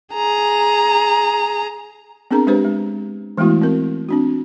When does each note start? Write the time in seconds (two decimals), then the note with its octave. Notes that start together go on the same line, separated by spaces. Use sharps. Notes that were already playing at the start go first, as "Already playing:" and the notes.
0.15 G#4 A#5
2.31 B3 C4 D4 G#4 A#4 A#5
2.47 G#3 D4 G4 B4 C5
2.64 G#3
3.38 E3 G#3 A3 B3 E4 F#4
3.62 C4 A#4
4.09 C4 D4 F#4